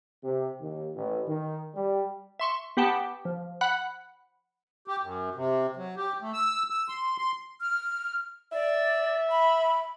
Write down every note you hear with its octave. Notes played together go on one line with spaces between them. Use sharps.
C3
D#2
A1
D#3
G3
E5 C6 C#6
B3 G4 F#5 G5 A5
F3
F#5 B5 F#6
G4
F#2
C3
F#3
G4
A3
E6
E6
C6
C6
F6
D5 E5
B5